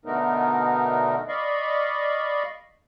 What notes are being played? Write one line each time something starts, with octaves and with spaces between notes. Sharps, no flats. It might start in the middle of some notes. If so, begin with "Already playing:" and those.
B2 D3 A3 B3 D#4 A#4
D5 D#5 F5 B5 C#6